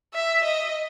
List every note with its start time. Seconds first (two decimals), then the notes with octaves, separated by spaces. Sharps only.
0.14 E5
0.44 D#5